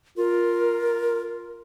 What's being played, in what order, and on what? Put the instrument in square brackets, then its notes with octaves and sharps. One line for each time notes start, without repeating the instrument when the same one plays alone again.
[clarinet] F4 [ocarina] A#4